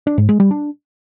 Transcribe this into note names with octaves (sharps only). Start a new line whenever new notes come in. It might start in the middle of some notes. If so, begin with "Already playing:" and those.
D4
G#2
G#3
G3
D4